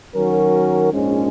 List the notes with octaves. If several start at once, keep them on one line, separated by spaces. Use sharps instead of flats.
D#3 F#3 C#4 F#4 A#4
A#1 G#2 F3 G#3 C#4